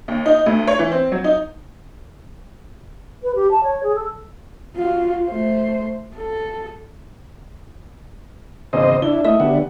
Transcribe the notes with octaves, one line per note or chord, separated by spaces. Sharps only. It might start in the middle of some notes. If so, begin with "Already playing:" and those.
D#2
D#4
D2
C#5
E3
C4
F#3
D#4
B4
G4
A5
C#5
G#4
A4
F4 F#4
A3 C5
A4
G#1 E2 C#3 C5 D#5
D4 E4 G7
A3 D#4 E4 E5 D#6
D3 B3 G4 F#5